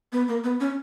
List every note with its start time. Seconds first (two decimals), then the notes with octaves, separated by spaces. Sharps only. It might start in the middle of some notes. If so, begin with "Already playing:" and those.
0.12 B3
0.28 A#3
0.44 B3
0.60 C#4